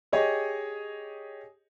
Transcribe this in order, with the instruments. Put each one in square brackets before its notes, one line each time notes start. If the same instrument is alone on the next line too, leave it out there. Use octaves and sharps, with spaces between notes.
[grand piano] G4 G#4 C#5 D#5